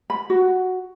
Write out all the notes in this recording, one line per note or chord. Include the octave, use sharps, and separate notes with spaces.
B5
F#4